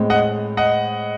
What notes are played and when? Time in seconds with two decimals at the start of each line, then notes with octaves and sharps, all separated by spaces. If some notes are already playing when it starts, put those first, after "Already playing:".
Already playing: A2 G#3 C4
0.10 D#5 F#5
0.57 D#5 F#5